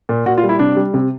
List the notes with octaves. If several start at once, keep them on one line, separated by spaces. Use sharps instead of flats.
A#2
A#2 F#4
F4
G3
E4
C3 D4
G3
C3